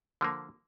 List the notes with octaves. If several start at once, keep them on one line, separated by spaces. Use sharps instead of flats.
D3 F3 A#3